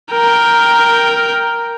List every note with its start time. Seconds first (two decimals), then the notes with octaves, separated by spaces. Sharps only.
0.12 A#4 G5